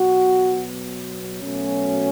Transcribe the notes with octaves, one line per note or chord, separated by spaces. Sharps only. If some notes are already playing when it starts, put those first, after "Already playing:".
Already playing: B2 F#3 B3 F#4
B2 F#3 A3 C#4